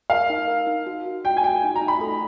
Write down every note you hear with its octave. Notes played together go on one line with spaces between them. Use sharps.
A#4 F5
D#4
A#4
D#4
F#4
F#4
F#4 G5
G#5
F#4 G5
D#4
A#5
D#4
B5
A4